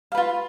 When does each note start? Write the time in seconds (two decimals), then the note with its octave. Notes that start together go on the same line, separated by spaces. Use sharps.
0.12 F5
0.15 B4
0.17 F4